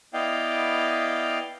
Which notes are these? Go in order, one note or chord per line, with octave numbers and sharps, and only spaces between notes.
B3 E4 D5 D#5 F5 G5